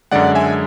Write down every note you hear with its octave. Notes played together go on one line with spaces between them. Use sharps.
F#2 D3 G#3 D5 F#5
E5 G#5